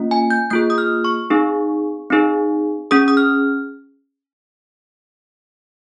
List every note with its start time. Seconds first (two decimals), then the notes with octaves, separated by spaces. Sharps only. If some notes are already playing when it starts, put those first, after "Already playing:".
Already playing: A#3 C#4 F4
0.11 G#5
0.30 G6
0.50 A#3 F4 G#4 G6
0.70 D#6
0.78 F6
1.05 C#6
1.30 C4 D#4 G#4
2.10 C4 D#4 G#4
2.91 C#4 G#4 D#6
3.08 D#6
3.17 F6